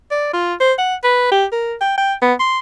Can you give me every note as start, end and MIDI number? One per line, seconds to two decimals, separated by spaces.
0.11 0.29 74
0.33 0.55 65
0.60 0.73 72
0.78 0.95 78
1.04 1.28 71
1.32 1.46 67
1.52 1.75 70
1.81 1.95 79
1.98 2.14 79
2.22 2.34 59
2.40 2.59 84